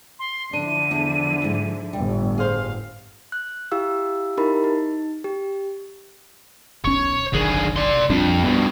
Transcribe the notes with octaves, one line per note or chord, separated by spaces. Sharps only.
C6
D3 F3 D4 E4 D#7
E2 D4
G#2
G1 A2 G3
G#4 C5 F5
F#6
E4 G4 F5 E6
D#4 E4 G4 A#4 B5
D#4
G4
D#1 B1 C#4 C#5
F#1 B1 D3 D#3 G#4
D5 C6
A#1 F2 G3 D4
G2 B2 B3